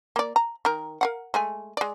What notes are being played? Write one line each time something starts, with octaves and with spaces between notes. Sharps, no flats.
A#3 D5
A#5
D#3 A#4
A#4 F5 F#5
G#3 A3 G#5
G#3 D5